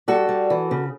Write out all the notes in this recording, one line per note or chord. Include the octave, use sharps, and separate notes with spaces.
G3 F#4 A4
G3
E3
C#3